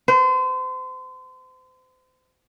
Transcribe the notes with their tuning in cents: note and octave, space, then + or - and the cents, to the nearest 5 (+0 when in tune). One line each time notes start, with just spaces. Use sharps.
C5 -35